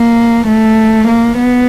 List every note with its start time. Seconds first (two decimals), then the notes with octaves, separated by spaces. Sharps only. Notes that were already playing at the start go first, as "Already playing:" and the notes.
Already playing: A#3
0.48 A3
1.07 A#3
1.38 B3